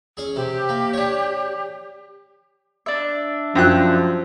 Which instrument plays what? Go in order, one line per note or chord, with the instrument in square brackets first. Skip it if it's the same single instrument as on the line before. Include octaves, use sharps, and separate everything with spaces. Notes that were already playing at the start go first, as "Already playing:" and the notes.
[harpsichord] C#4 G#4
[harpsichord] C3 [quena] G4
[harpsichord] A#3
D4 C#5
[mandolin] D4 E5
[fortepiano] F#2 G5 F#6 [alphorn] F3